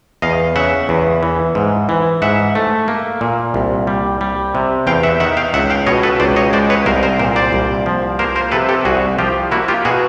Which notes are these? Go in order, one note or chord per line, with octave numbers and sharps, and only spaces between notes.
E2 D#5 F5
C#3 E5 F#5
E2
E3
G#2
E3
G#2 E5 F#5
A3
A#3
A#2
C2
G3
G3
C3
E2 F5 G5
E5 F#5
D#3 E5 F#5
F5 G5
C#2 E5 F#5
F5 G5
B2 C#5 D#5
A4 B4
C#2 C5 D5
C#5 D#5
G#3 C5 D5
B4 C#5
C2 A#4 C5
A#4 C5
A#2 A#4 C5
C5 D5
C2
F3
A#3 A#4 C5
A#4 C5
C3 A4 B4
G4 A4
C2 F#4 G#4
F3 F4 G4
A#3 E4 F#4
F4 G4
B2 F#4 G#4